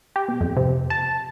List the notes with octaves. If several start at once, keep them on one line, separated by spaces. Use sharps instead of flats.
G4
B2
F2
C3
A5